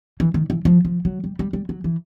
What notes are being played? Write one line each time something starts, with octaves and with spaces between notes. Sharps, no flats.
E3
D#3
E3
F3
F3
F#3
G3
G3
G3
F#3
E3